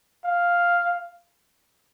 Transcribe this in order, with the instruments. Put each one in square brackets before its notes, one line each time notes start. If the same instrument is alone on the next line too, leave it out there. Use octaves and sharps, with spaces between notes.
[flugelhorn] F5